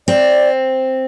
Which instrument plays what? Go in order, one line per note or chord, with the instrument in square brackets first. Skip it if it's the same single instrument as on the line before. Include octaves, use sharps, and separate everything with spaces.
[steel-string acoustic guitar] C4 [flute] D5